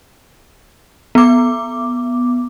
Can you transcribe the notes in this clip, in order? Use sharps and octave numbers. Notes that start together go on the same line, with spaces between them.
B3 D6